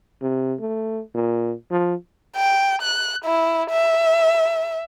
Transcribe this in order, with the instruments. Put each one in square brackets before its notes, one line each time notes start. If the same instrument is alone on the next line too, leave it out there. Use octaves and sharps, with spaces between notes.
[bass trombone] C3
A3
A#2
F3
[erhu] G5
F#6
E4
E5